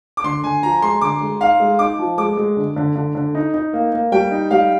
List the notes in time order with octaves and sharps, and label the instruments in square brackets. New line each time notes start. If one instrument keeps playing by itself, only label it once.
[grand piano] D6
[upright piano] D3 [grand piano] C6
[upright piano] D3 [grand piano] G#5
[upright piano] F3 [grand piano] A#5
[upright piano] G#3 [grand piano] C6
[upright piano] D3 [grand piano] D6
[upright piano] G#3
[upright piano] D#4 [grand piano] F5
[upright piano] G#3
[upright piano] D#4 [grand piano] D6
[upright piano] F3
[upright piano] G#3 [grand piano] D6
[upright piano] G#3
D3
D3
D3
D3
D#4
D#4
A#3
A#3
[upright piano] G3 [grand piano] G5
[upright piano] D#4
[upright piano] G3 [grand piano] F5